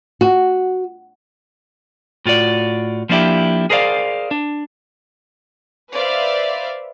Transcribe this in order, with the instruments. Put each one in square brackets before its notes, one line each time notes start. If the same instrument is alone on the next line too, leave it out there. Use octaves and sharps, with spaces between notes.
[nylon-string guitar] F#4
[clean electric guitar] A2 F4 F#4 D5
F3 A#3 D4 E4 G4
G#4 A#4 C5 D5 F5
D4
[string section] B4 C5 D5 E5 F5